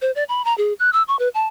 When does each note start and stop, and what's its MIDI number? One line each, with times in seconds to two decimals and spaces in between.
0.02 0.11 72
0.16 0.24 74
0.29 0.44 83
0.45 0.56 82
0.58 0.73 68
0.80 0.90 90
0.93 1.03 88
1.08 1.18 85
1.19 1.29 71
1.34 1.48 81